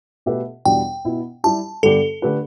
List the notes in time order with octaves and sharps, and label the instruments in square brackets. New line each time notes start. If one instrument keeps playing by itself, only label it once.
[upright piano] B2 A3 G4 B4 E5
[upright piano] E2 B2 G3 D4 [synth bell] G5
[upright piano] B2 B3 E4
[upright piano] G3 E4 G4 [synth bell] A5
[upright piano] G2 D3 B3 G4 D5 [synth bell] A4
[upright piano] D3 A3 G4 B4